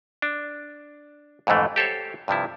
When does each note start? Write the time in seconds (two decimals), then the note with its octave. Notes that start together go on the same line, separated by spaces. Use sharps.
0.22 D4
1.47 F2 G#2 D3 E3 A3
1.76 G4 A4 C5 C#5
2.28 G2 C3 F3 E4